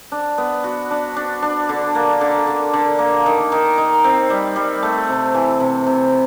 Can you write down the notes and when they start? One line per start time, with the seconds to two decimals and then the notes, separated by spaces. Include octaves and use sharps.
0.12 D4
0.38 B3
0.64 F#4
0.91 D4
1.16 D4
1.42 D4
1.69 D3
1.95 A#3
2.21 D3
2.47 D3
2.74 D3
2.99 A#3
3.26 D#3
3.52 D#3
3.78 D#3
4.04 C4
4.30 G3
4.56 G3
4.83 A3
5.09 C3
5.34 E3
5.60 C3
5.87 C3